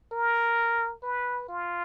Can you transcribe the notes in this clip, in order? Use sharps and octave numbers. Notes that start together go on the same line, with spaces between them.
A#4
B4
F4